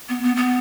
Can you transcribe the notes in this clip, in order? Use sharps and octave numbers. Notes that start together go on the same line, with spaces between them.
B3
B3
B3